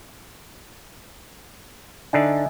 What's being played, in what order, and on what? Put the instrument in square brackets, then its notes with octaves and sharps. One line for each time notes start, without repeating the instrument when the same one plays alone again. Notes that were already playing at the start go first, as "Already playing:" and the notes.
[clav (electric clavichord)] D3 D4 D#4 [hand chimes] D#5 E5 G#5